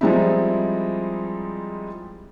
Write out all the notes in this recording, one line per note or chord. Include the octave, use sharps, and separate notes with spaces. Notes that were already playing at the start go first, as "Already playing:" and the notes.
F3 G3 G#3 C4 D#4 E4